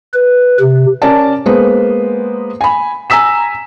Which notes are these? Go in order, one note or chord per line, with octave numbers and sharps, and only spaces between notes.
B4
C3
C#4 A#4 D5 A5
G#3 A#3 B3 B4 C5
G#5 B5
G#5 A#5 E6 B6 E7